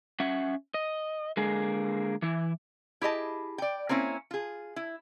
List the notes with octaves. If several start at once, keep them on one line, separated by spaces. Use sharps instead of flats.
C#4 E5 F#5
D#5
D3 G#3 A#3 G#4
E3 E4
E4 G4 G#4 D#5 A5
D5 G5
A#3 C4 C#4 E4
F4 G#4
E4